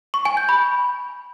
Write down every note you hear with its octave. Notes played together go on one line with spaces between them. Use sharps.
C#6
G#5
G6
B5